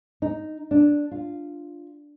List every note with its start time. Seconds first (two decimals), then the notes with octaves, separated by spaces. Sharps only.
0.22 D#4
0.71 D4
1.11 F4